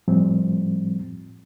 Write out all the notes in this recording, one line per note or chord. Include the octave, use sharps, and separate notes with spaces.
A2 F3 G3 C4